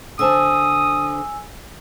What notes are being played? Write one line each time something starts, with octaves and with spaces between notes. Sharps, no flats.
D3 C5 G#5 A5 D#6 E6